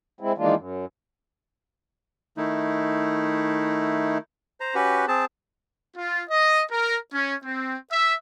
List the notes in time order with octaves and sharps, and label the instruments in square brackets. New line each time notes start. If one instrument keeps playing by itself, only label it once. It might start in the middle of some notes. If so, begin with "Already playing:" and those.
[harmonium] G#3 C4 E4
D#3 E3 G#3 A#3 D4 F4
F#2
[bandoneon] D#3 A3 D#4 E4
[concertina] C5 A#5
C#4 F#4 G4 B4
C4 G#4 A5
[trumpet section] F4
D#5
A#4
C#4
C4
E5